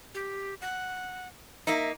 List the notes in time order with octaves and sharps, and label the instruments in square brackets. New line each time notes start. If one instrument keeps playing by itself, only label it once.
[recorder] G4
F#5
[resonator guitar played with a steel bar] A#3 D#4 [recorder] E5